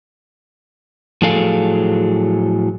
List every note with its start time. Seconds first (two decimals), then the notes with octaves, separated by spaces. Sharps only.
1.22 A2 F3 F#3 G#4 A4 F5